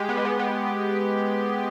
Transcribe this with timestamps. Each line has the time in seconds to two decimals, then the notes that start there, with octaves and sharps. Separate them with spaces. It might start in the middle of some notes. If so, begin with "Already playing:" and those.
Already playing: G#3 G4
0.09 B3
0.17 G#3
0.25 B3
0.39 B3